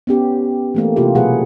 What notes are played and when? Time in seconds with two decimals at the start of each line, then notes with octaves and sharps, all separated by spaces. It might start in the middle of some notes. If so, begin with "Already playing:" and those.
0.07 B3 C#4 G4
0.75 E3 A3 A#3
0.96 C3 E4 F4 G4
1.15 B2 F#3 F#4 G#4 B4 F#5